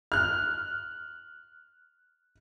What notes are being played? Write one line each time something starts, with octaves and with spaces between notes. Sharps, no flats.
F6 F#6